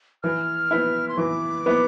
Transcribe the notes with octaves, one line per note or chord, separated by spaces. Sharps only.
E3 F6
B3 E4
C6
E3 D6
B3 E4